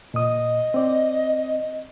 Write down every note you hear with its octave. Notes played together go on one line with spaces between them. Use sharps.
A#2 D#5 D#6
C4 D5